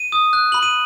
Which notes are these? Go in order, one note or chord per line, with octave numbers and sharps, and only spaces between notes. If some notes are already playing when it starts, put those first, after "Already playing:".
Already playing: D#7
D#6
F#6
B5 F#7
D#7